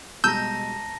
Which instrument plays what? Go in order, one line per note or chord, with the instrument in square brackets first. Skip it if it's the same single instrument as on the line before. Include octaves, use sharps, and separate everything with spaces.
[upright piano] B2 G3 G#3 [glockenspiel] A5 A#5 A#6 [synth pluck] E6 G6